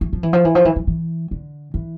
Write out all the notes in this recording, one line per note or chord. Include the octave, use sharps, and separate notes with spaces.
E3
F3
E3
F3
E3
F3
E3
F3
E3
D3
E3